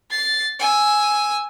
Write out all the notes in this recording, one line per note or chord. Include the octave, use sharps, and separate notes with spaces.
A6 C7
G#5 E6